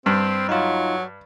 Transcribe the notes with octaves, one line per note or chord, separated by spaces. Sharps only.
G2 C4
F#3 D#4 F4